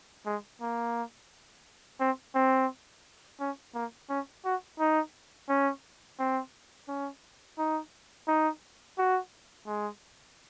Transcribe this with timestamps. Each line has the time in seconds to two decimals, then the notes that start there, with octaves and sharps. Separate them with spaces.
0.26 G#3
0.61 A#3
2.00 C4
2.35 C4
3.40 C#4
3.74 A#3
4.09 C#4
4.45 F#4
4.79 D#4
5.49 C#4
6.19 C4
6.88 C#4
7.59 D#4
8.28 D#4
8.98 F#4
9.67 G#3